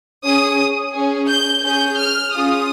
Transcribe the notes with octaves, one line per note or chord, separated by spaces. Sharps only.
C#4 G#4 D#6
C#4 G#4
G6
C#4 G#4 G6
F6
C#4 F4 G#4 D#6